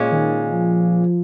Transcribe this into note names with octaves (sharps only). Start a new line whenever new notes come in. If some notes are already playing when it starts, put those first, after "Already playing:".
Already playing: A#2 G#3 C#4
D#3
F3